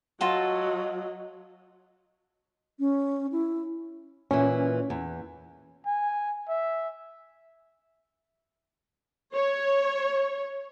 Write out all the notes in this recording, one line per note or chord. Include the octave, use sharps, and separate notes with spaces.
F#3 F4 F#4 A4 D#5
C#4
E4
A#2 E3 C#4
E2
G#5
E5
C#5